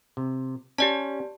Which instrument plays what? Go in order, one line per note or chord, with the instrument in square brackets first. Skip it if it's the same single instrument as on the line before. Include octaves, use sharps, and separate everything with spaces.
[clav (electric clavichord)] C3
[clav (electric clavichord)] C#4 [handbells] G4 D5 A5